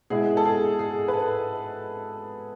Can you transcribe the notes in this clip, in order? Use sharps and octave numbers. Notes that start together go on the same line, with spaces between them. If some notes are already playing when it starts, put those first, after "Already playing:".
B2 G#3 B3 E4 G#4
A4
G#4
G#4
B4
A4